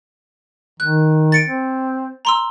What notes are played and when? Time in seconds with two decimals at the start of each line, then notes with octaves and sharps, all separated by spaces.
0.80 D#3 F#6
1.32 A6 C#7 D7
1.46 C4
2.25 A#5 C6 E6